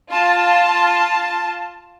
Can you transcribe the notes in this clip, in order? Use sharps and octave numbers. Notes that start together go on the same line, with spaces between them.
F4 A5